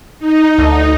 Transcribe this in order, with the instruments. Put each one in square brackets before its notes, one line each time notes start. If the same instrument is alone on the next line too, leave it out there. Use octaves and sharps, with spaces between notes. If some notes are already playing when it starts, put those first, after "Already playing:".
[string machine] D#4
[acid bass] D2